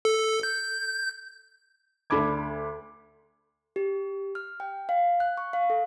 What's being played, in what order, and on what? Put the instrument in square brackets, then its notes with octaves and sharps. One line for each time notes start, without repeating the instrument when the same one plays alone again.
[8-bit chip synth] A4
G6
[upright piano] D2 A3 D4 B5 D6 G#6
[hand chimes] G4
F6
G5
F5
F#6
C#6
F5
A4